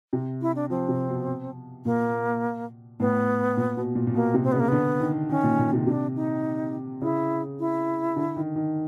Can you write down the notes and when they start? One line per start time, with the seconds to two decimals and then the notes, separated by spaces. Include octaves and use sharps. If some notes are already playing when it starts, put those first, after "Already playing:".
0.13 C3
0.41 E4
0.55 D4
0.70 F3 C4
0.88 C3
1.09 B2
1.85 A#2 A#3
3.00 A2 B3
3.57 A#2
3.77 B2
3.95 A#2
4.07 A#2
4.14 B2 A#3
4.34 C3
4.43 C4
4.52 C#3 B3
4.60 A#3
4.68 D3 B3
5.00 D#3
5.29 D#3 C#4
5.43 A#2
5.59 A#2
5.73 C3
5.87 C3 D4
6.16 D#4
7.02 C#3 E4
7.59 E4
8.16 D3
8.36 D#3
8.56 D#3